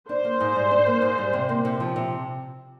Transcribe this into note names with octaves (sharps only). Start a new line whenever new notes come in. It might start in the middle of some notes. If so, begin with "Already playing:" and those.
D4 C5
A#3
G#2
G3
D4
A#3
G#2
G3
C3
A#3
C3
F3
C3